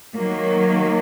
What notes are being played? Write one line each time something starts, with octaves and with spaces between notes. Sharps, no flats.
D#3 F#3 A#3